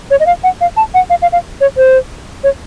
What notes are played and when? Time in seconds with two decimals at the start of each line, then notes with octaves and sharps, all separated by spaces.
0.11 C#5
0.20 D#5
0.26 F5
0.44 F#5
0.61 F5
0.77 A5
0.94 F#5
1.10 F5
1.22 F5
1.32 F5
1.61 C#5
1.77 C5
2.44 C#5